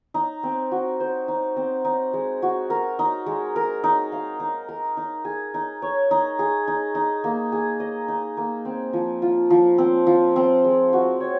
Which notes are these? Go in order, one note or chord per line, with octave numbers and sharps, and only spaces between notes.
D#4
C4
F#4
C5
D#4
C4
D#4
G#3
F#4
A#4
D#4
G#3
A#4
D#4
F5
D#4
A#4
D#4
G#4
D#4
C#5
D#4
G#4
D#4
D#4
A#3
G#4
D#5
D#4
A#3
C4
F3
F4
F3
C4
F3
C4
G#3
F#4
C#5